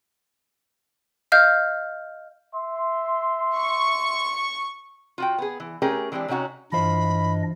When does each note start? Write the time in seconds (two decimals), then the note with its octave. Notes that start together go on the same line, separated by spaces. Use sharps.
1.32 D#5 F5 F6 G6
2.53 E5 C6
3.57 C#6
5.18 F4 F#4 G5
5.38 B3 G#4
5.60 E3
5.82 A3 C#4 G4 G#4 A#4 G5
6.12 E3 G#3 C4 D4 G4
6.28 C3 C#4 D#4 F#4 C#5
6.72 G2 E3 D4 F4 C5 D#5 B5